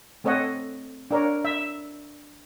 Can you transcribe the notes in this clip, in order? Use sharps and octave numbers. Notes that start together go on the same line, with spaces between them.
A3 C4 A4 C#5 D#5 F#5
D4 A#4 C#5
E5